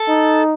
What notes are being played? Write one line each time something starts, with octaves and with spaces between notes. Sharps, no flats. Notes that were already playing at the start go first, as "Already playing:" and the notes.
Already playing: A4
D#4